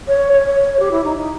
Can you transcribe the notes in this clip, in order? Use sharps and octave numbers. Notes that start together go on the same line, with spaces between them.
C#5
C#5
G4
E4
D#4
D#4